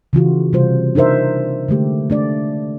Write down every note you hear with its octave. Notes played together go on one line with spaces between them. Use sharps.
C#3 E3 F4 F#4
C3 G3 F4 C5
D4 D#4 A#4 C5 E5
D3 G#3 A3 G4
A3 D4 D5